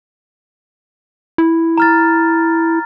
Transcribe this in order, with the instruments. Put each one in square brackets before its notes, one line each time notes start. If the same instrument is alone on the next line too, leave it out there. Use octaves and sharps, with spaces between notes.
[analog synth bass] E4
[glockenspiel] A#5 F6 A6